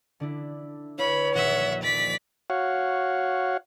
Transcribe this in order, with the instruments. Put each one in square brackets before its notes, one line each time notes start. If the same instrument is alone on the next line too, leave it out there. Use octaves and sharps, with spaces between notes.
[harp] D3 D4 E4
[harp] E4 B4 F5 [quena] C#5 [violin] B5
[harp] D#1 A#1 F#6 [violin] E5 F#5
[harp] D#2 F3 [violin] D5 B6
[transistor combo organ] F#4 C#5 F5 F#5